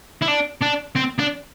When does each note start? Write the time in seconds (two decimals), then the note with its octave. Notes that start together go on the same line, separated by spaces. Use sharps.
0.22 E4
0.28 D4
0.62 D4
0.96 C4
1.19 D4